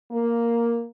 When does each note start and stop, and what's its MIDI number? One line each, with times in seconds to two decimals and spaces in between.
0.11 0.85 58